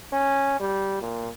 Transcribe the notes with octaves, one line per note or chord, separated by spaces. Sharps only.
C#4
G3
A#2